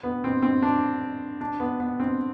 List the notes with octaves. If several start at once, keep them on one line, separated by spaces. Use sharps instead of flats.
B3
C4
C4
D4
D4
B3
B3
C4